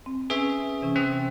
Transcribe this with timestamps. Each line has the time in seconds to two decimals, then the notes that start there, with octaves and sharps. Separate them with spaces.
0.06 C4
0.30 C#4 G#4 B4 E5
0.82 C3 E3 C#4
0.96 C4